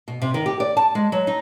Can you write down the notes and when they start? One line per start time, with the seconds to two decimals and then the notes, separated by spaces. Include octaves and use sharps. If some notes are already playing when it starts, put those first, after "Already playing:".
0.08 B2
0.22 C3
0.34 D#3
0.46 G4
0.60 D5
0.77 A5
0.95 G#3
1.12 F#3
1.27 D#4